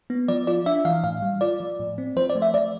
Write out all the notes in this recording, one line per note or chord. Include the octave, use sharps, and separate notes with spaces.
B3
F3 D5
F4 D5
D4 E5
E3 F5
A2 F5
G3
F4 D5
F3
A2
C4
F3 C5
D5
A3
E5
F3 D5